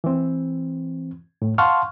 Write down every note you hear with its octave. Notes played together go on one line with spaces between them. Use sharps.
E3 C4
A2
F5 F#5 A5 C6 C#6 F6